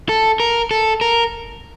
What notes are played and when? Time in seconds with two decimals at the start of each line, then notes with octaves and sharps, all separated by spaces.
0.09 A4
0.40 A#4
0.71 A4
1.01 A#4